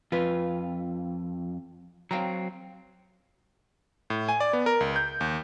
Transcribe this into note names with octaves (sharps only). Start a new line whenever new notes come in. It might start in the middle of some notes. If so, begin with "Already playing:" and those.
F2 F4 B4
F#3 C4 F5 G5 A#5
A2
G#5
D5
B3
A#4
C#2
G6
D#2